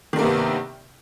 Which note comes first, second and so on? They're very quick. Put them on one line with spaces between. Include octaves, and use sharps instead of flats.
D#3 G2 A#3 C3 B3